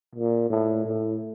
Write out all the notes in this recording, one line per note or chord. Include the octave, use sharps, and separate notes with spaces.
A#2
A2
A2